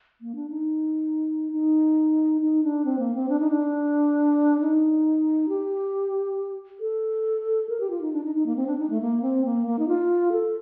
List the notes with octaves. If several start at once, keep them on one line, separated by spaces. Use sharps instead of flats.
A#3
D4
D#4
D#4
D#4
D4
C4
A#3
C4
D4
D#4
D4
D#4
G4
A4
A#4
G4
F4
D#4
D4
D#4
D#4
A#3
C4
D4
D#4
A3
A#3
C4
A#3
A#3
D#4
F4
A4